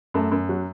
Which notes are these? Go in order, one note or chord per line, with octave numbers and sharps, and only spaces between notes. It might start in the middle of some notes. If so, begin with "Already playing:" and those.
F#2 A3
F#2
F#3